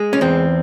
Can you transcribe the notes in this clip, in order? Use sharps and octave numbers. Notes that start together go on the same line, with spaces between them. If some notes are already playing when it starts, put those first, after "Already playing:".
Already playing: G#3
C#4
E2 C4